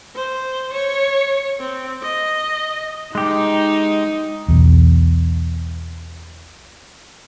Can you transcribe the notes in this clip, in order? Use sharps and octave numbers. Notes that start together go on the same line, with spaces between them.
C5
C#5
C4
D#5
G#3 D#4 G4
B1 E2